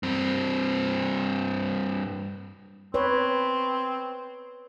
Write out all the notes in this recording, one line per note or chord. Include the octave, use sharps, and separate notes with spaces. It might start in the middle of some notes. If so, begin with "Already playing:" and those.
G2 C4
C4 B4 C#5